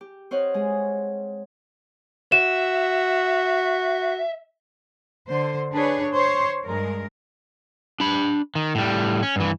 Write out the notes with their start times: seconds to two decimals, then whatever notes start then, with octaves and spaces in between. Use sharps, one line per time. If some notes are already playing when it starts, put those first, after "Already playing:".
0.01 G4
0.31 C4 C5 C#5 D#5 F5 F#5
0.54 G#3 G#4
2.32 F#4 E5 E7
5.26 D3 C5
5.73 D4 G#4 B4 C#5
6.12 C5 C#5
6.63 G2 G#3 A#4
8.00 D4 B5
8.55 D#3
8.75 A2 G3
9.23 C#4
9.36 G2 E3